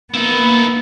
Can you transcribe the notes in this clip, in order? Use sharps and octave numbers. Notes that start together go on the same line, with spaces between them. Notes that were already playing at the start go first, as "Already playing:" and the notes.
A#3 B3 D#4 E4